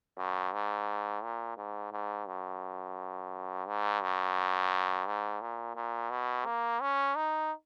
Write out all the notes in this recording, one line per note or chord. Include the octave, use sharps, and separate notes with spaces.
F#2
G#2
A#2
G#2
G#2
F#2
G#2
F#2
G#2
A#2
A#2
B2
A#3
C#4
D#4